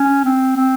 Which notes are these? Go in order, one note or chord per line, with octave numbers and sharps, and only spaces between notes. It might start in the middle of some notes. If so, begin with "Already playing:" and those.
Already playing: C#4
C4
C4